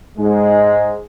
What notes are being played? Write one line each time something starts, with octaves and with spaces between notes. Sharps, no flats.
G#2 G#3